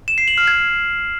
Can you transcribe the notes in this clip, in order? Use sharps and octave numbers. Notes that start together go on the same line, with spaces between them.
E7
C7
F#7
F6
G#6